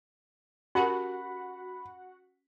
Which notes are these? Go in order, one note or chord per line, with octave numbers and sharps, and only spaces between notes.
C#4 F#4 G4 A#4 F#5 B5